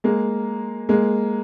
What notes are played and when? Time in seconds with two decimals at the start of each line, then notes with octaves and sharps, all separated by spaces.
0.04 G#3 A#3
0.89 G#3 A#3